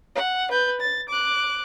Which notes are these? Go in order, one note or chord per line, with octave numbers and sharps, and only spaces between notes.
F#5
B4 G6
A6
D6 F#6